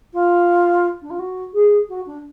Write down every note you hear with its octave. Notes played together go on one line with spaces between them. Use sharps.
F4
D4
F4
F#4
G#4
F#4
D4